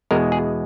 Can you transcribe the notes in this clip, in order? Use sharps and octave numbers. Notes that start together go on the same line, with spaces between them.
E2 B2 G#3 A#4
G#4